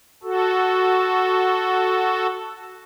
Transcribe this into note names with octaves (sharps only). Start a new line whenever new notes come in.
F#4 A4